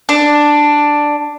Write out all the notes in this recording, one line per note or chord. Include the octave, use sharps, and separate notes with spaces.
D4